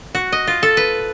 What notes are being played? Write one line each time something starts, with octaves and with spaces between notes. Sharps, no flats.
F#4
D#5
F4
A4
B4